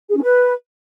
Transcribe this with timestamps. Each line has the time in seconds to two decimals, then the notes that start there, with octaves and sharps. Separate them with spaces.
0.09 G#4
0.16 C#4
0.22 B4